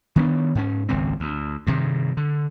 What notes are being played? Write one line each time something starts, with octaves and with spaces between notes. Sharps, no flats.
D#3 B3 C4 D4
G#2 C#4
D#1 G#1 C#2 C4
D2
G2 C3 D#3
D3